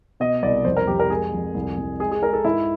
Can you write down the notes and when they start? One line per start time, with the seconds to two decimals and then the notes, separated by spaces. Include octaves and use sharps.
0.20 B2 D#5
0.42 C2 D5
0.65 F2 C5
0.77 A#4
0.87 F2 G4
1.00 A#4
1.10 G#3 G#4
1.33 F2
1.54 C2
1.78 C2
2.00 G#3 G#4
2.12 G#4
2.22 G#3 A#4
2.33 A4
2.44 G#2 E4